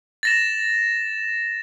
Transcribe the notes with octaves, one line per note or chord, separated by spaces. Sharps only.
A6 A#6 E7